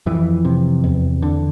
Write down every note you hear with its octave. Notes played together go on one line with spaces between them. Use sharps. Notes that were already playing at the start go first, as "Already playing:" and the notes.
F2 E3
C3
E2
D3